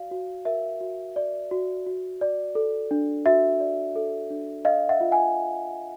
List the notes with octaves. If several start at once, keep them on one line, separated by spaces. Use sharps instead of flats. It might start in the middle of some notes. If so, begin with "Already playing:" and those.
Already playing: F#4 D5 F5
F#4
A#4 E5
F#4
D5
F#4
F#4
D5
A4
D4
F#4 E5
D5
A4
D4
A4 D#5 F5
E5 F#5
F4
F#5 G#5